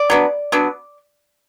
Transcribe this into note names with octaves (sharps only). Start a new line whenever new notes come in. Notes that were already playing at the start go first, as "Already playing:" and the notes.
Already playing: D5
F#3 B3 D4
F#3 B3 D4